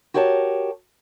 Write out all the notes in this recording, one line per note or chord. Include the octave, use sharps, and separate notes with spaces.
F#4 G4 A#4 C#5 E5 A5